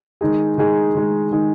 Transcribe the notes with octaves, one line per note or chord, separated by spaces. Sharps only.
D#3 G#3 D#4 G#4
D#3 G#3 D#4 G#4
D#3 G#3 D#4 G#4
D#3 G#3 D#4 G#4